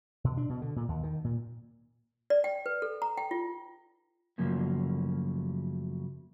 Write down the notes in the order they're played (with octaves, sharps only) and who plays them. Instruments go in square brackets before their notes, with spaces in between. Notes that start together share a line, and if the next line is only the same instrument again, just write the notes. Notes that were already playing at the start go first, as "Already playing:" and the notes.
[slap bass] B2
D4
B2
D3
A#2
D#2
D#3
A#2
[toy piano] D5
G5
B4
A4
A#5
G5
F4
[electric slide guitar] F#2 C#3 F3 A3 A#3